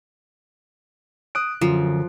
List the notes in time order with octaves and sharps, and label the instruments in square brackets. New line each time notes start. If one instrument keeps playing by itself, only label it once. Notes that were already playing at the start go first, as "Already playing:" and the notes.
[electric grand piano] D#6 F#6 D7
[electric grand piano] F#2 [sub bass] D3 [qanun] F3